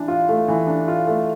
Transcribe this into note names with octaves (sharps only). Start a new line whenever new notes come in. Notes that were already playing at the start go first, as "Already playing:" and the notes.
Already playing: E3 D4
F4
A3
E3
D4
F4
A3